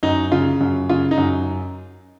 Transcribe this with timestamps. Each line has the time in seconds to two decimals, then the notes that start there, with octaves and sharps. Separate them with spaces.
0.03 F#2 D#4
0.32 C#3 F4
0.61 F#2
0.89 C#3 F4
1.11 D#4
1.18 F#2